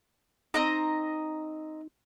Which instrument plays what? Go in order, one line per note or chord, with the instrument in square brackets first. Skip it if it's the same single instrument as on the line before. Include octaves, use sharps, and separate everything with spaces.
[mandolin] C4 D#5 A#5 [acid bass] D#4